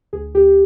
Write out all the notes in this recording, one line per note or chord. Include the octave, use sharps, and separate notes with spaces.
D2 G#4
D2 G4